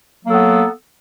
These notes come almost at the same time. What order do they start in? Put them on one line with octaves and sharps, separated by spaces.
F#3 A#3 A4 B3